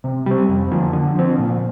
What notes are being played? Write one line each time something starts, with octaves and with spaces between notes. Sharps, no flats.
C3
G3 C4
F2
D3 F3 A#3
D3
F3 C4
A#2